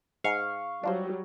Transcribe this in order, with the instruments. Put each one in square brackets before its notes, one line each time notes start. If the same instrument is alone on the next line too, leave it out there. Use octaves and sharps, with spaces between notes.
[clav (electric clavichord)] G#2 [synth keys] F5 C#6
[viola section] F#3 G3 [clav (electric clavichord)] D4 F4 C5